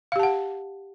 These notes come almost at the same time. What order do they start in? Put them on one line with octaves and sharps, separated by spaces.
F5 G4 A5 F#5